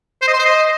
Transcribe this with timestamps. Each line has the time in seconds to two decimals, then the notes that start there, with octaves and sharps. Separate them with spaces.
0.22 C5
0.28 D#5
0.34 C6
0.39 C5
0.45 D#5